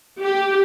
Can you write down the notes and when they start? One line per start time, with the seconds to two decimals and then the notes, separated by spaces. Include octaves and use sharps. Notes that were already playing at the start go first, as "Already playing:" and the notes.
0.21 G4